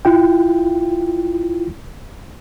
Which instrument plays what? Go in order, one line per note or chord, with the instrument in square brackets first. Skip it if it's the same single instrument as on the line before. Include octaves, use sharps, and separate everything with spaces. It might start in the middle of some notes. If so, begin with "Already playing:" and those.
[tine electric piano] E4 F4 G5